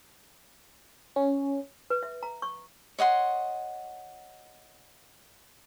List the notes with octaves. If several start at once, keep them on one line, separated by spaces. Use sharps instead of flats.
C#4
B4
E5
A#5
C#6
C#5 D#5 F#5 C6